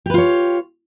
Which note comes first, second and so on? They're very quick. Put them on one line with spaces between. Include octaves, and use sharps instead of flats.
G4 B4 F4 C#5